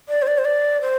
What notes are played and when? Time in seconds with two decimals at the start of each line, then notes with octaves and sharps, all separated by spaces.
0.09 D5
0.22 C5
0.27 D5
0.38 C5
0.45 D5
0.81 C5